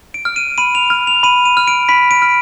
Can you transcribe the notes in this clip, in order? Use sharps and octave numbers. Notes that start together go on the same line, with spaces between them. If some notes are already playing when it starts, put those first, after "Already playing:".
D7
F6
D#7
B5 D#7
F7
F6
F7
B5 D#7
D#7
F6
D7
B5 B6
D7
F6